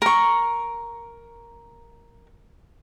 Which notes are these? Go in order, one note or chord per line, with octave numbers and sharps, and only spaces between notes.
A#4 C#6